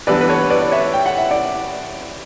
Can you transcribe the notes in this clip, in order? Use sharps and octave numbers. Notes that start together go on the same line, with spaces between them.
E3 G3 B3 D4 B4 D5
B4
A4 C#5
B4 D5
D5
C#5 E5
G5
F#5
E5
D5 F#5